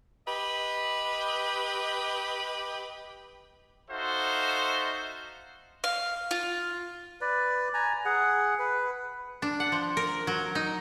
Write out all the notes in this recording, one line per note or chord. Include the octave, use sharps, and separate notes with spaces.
G4 B4 D#5
D#4 F#4 A4 C5 E5 F5
F5
F4
B4 D5
G#5 A#5
G#4 F#5
B4
D4
F#5
F3
A#4
F#3
D#4